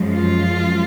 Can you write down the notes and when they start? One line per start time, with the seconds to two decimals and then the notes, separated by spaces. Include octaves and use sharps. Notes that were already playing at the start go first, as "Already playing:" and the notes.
Already playing: F#2 F3 G#3
0.13 F4